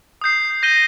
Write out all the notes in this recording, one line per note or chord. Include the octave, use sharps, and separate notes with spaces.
D#6 G6 C7
G6 A#6 D#7 G7